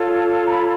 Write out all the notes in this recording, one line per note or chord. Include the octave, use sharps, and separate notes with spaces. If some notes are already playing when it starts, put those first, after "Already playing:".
Already playing: F4 A4 C#5
A#5
B5